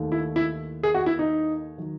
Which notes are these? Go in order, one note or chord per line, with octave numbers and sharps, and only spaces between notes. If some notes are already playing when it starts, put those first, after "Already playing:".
Already playing: D#2 D#3 A3
E4
E4
G#4
F#4
E4
D#4
D#3 F#3